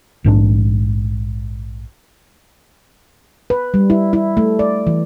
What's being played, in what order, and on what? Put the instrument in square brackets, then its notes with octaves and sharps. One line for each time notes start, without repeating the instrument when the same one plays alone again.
[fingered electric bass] A#1 G#2 B2 D4
[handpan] B4
G3
E4
E4
A3
D5
E3